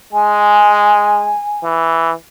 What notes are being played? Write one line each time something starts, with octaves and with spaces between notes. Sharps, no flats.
G#3 G#5
E3